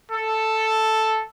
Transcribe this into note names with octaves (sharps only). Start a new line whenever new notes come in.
A4